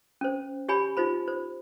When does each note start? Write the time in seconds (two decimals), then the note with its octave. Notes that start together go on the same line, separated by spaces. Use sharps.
0.21 C#4 C5
0.69 G4 C#5 G#5 B5
0.97 D#4 F4 C5 B5
1.28 C5